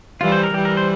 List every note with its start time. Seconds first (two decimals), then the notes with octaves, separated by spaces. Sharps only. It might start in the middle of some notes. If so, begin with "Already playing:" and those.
0.21 E3 G3 F4
0.32 C5
0.43 A#4
0.54 E3 G3 G4
0.65 A#4
0.77 C5